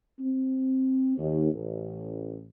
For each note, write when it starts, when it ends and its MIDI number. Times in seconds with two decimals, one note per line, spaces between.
0.20 1.17 60
1.17 1.51 39
1.53 2.42 33